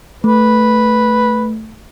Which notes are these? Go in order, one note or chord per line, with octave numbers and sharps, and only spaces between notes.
A3 B4